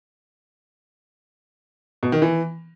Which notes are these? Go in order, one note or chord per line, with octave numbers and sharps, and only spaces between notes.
B2
D#3
E3